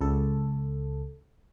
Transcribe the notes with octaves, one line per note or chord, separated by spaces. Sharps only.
C#2 A4